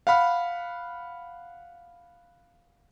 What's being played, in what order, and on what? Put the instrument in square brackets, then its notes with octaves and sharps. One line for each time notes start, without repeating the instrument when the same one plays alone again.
[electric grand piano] F5 F#5 B5 F6